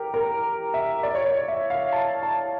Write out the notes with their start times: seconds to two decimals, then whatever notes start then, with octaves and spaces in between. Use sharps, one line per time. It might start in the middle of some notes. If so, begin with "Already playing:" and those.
Already playing: G4 A#4
0.14 A#4
0.74 E5
1.03 D5
1.15 C#5
1.26 D5
1.48 E5
1.70 F5
1.93 A5
2.23 A5